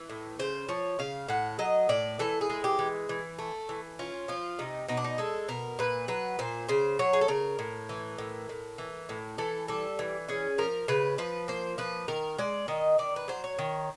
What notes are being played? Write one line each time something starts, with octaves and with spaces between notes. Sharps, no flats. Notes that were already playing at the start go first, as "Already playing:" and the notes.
Already playing: E3
A2
C#3 C5
F3 C#5
C#3 F5
A2 F#5
F#3 D#5
A2 D5
E3 A4
G#4
G#3
G4
E3
E3
A3
E3
C#4 F4
F3 F4
C3 D#4
B2 D#4
D4
D#4
G#3 A4
B2 A#4
A#2 B4
F#3 B4
A#2 C5
C#3 C5
F#3 C#5
G#4
A4
C#3 A#4
A2
E3
A2
A2
E3
A2
E3 A4
G3 A4
E3
C#4 G#4
F3 A#4
C#3 B4
F3 B4
A#3 C5
F3 B4
D#3 A#4
G#3 D5
D#3 D#5
D#3 D5
B4
F#3 C5
C#5
D#3